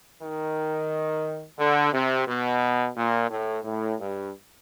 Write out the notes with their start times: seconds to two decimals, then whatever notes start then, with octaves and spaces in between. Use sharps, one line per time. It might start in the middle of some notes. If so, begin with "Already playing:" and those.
0.22 D#3
1.59 D3
1.93 C3
2.27 B2
2.96 A#2
3.30 A2
3.64 A2
3.99 G2